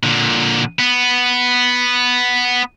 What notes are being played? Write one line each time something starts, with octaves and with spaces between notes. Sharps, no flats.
A#2 D3
B3